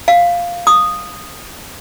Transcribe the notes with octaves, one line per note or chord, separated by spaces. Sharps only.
F5
D#6